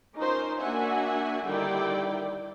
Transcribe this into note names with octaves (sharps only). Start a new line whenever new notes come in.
C#4 D#4 F4 A#4 C5
A#3 D4 F#4 E5 F#5 G#5
D3 D#3 G3 E4 D5 G5